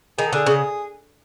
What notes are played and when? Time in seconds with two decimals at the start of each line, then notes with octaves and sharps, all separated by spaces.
0.18 D#3 G#4
0.28 A4
0.33 D3 G#4
0.46 C#3